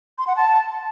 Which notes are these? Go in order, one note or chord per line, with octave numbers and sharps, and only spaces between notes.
C6
F#5
A5